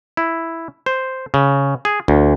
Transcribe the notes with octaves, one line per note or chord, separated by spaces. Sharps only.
E4
C5
C#3
G#4
D2